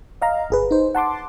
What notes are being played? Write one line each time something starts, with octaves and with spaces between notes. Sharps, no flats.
D#5 F5 A#5
G1 G#4 B4
D#4 C5
F#5 A5 C6 D6